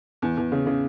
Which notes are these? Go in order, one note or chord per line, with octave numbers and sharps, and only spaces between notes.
E2
E2
C#3
C#3